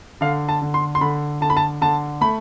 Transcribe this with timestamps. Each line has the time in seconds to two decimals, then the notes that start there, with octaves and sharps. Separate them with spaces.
0.21 D3 F5
0.49 A5
0.62 D3
0.74 C6
0.95 C6
1.01 D3 B5
1.41 D3 A5
1.50 B5
1.57 A5
1.81 D3 A5
2.21 A3 B5